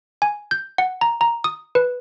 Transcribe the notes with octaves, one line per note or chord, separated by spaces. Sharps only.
G#5
G6
F#5
A#5
A#5
D#6
B4